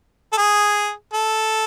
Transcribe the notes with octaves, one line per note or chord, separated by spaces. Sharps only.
A4
G#4
A4